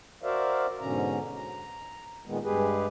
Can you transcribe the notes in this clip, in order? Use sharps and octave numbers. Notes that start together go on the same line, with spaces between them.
F#4 A#4 C5 D5 E5 F5
G#2 B2 D3 C#4 A#5
A#5
A#2 D#3 G#3 B3
G2 G#3 G4 G#4 B4